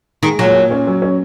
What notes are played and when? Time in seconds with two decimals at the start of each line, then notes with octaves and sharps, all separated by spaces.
0.23 D#3 G#3
0.39 A#2 F#3
0.55 A#2
0.71 C#4
0.87 F#3
1.02 C#4